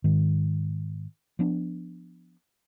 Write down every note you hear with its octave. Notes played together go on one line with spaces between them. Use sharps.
G#2 D#3
F3 B3 D4